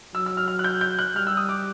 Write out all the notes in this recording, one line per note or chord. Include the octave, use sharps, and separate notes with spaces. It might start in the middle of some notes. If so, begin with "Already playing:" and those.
F#3 E6
E6
F6
F6
F#6
G6
G6
F#6
G3 F6
E6
D#6
D6